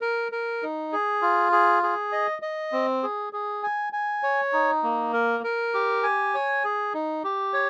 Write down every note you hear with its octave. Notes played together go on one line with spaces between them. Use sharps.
A#4
A#4
D#4
G#4
F4
G#4
G#4
D#5
D#5
C4
G#4
G#4
G#5
G#5
C#5
D#4
A#3
A#4
A#4
G4
G#5
C#5
G#4
D#4
G4
C#5